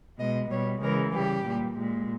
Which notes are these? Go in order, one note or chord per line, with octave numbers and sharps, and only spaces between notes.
B2 G#3 D#5
B2 G3 C#5
C#3 E3 G#3 A#4
C#3 G3 G4
A#2 G3
A#2 G#3